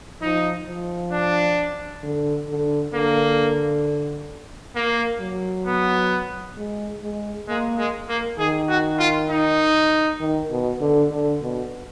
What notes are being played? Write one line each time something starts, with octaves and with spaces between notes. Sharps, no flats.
F3 D#4
F3
D4
D3
D3
D3 A#3
A#3
F#3
B3
G#3
G#3
G#3 A#3
G#3
A#3
D#3 G#4
F#4
F4
D#4
D#3
B2
D3
D3
B2